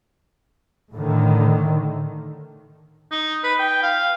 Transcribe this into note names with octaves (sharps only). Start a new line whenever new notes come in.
A2 D3 D#3
D#4
B4
G5
F5